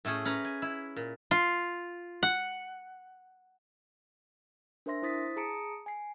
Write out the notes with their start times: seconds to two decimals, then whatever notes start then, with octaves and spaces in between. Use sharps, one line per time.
0.05 A2 A3 C#4 G#4
0.25 C#4 B4 A#5
0.45 G#5
0.62 E4
0.96 A#2
1.31 F4
2.23 F#5
4.86 D4 A#4 C5 E5 C6 A#6
5.02 E4 C5 D#6 A6 B6
5.36 G#4 A5 A#5 D#6 C#7 D7
5.86 G#5 C7